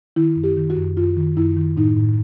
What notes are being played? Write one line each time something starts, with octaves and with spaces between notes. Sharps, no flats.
D#3 E4
F#2
G4
D#3
F#4
F#2
F#2 F4
D#3
F#2 E4
D#3
A2 D#4
A2